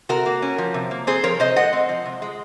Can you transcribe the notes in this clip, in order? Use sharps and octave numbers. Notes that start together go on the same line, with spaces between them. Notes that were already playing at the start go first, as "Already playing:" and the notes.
C3 F#4 A#4
A#3
C#4
F3
C3
A#3
C4 G#4 C5
F3 A#4 C#5
C3 C5 D#5
G#3 D#5 F#5
C4
F3
C3
G#3